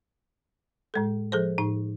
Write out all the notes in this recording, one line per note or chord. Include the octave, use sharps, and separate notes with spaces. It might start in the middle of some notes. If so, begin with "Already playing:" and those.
A2 G#3 A4
F3 G#4 A4 C5
A2 D#4